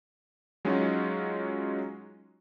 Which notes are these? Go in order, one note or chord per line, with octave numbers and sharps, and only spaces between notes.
F#3 G#3 C#4 D#4 F4 F#4